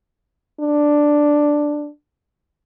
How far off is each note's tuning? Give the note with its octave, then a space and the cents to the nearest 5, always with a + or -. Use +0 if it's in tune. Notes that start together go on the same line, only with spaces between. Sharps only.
D4 +5